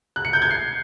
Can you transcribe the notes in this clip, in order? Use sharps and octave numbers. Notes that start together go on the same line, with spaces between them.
F#6
C#7
G6
G#6
C7